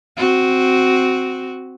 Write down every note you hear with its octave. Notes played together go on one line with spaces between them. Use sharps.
C4 F#4